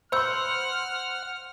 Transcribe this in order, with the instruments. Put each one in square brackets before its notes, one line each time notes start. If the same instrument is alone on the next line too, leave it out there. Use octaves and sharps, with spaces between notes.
[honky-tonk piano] C5 C6 [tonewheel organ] F#5 [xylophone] B5 E6 G6 [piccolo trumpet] F6